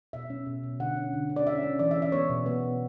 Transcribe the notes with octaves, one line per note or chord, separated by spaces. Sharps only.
B2 E5
C#4
B2
B2
D3 F#5
C#4
D3
C#4
D5
C#4 E5
C#4
E3 D5
E5
C#4
E5
B3 C#5
B2
B3
B2